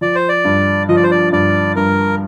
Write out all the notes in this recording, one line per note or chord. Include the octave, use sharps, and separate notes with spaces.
F3 D5
C5
D5
G2
F3 D#5
D5
C5
D5
G2 D5
G2 A#4